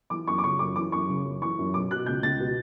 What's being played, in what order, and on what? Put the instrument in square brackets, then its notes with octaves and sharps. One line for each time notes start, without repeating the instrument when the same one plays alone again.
[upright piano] E3 D6
F#2 C#6
D6
C#3 C#6
F#2 D6
E3 D6
F#2 C#6
C#3
F#2
E3 C#6
F#2
B2 D6
B2 F#6
C#2 G6
C#2 A6
B2